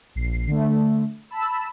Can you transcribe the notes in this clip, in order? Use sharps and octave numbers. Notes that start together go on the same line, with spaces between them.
A#1 C7
D3 A3
A5 B5 E6